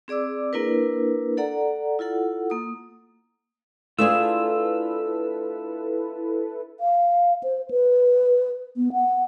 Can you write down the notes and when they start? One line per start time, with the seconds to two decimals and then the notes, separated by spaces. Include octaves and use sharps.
0.08 C4 G#4 D5 D6 E6
0.53 A#3 D4 E4 A#4 B4
1.37 A4 D5 F#5 A#5
1.99 E4 F4 A4 F#5
2.50 A#3 D#6
3.98 A3 D4 E4 F4 G#4 A4 B4 E6
6.80 F5
7.43 C5
7.71 B4
8.77 B3
8.93 F#5